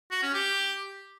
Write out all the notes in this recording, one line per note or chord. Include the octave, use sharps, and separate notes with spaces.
F#4
C#4
G4